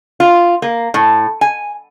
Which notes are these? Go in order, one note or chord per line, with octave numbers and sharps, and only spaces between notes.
F4
A#3
A2
G#5